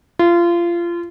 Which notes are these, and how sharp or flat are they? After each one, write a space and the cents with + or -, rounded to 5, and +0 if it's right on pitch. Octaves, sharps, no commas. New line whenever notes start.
F4 -25